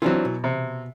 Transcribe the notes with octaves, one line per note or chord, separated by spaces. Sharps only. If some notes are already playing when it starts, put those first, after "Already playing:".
E3 F#3 C4 D4 F4
B2
C3